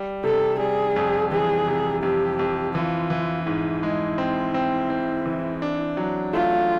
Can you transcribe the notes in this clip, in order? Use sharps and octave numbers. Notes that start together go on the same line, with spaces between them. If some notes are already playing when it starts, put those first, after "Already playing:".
Already playing: G3
C3 A4
G3 G#4
F2
E3 G#4
C3
F2 G4
F2
E3 F4
E3
G#2 E4
G#3
C4
C4
C4
E3
D4
F#3
A3 F4